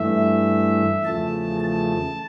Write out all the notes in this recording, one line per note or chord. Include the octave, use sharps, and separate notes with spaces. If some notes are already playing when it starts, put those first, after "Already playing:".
Already playing: G2 E3 A3 E5
E2 C#3 F3 A3 A5
A5